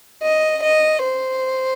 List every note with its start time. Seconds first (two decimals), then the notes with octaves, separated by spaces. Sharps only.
0.24 D#5
0.63 D#5
1.03 C5